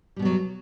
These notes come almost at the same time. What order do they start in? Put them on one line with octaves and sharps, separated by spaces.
G3 B2 B3 F#3